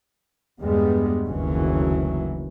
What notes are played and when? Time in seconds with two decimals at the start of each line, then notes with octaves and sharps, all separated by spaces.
0.60 E2 G2 G3 G#3 B3
1.27 F#1 D2 D#3 E3 F#3 C#4